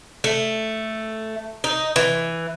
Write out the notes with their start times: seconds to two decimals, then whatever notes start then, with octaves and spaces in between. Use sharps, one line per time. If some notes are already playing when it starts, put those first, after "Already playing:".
0.24 A3
1.64 D#4
1.96 E3